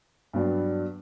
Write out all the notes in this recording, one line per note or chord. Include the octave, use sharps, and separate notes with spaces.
G2 F#3 B3 D4